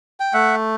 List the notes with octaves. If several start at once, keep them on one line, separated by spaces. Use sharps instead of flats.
G5
A3 E5 F#5